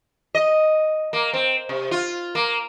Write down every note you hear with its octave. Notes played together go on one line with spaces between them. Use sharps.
D#5
A#3
C4
C3
F4
A#3